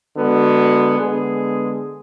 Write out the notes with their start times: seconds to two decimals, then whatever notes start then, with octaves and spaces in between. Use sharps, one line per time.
0.17 D3 G#3 B3 F#4
0.99 D3 G#3 B3 G#4